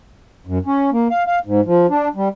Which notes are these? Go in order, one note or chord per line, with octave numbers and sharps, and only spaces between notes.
F#2
C#4
A#3
F5
F5
G#2
F3
D4
G3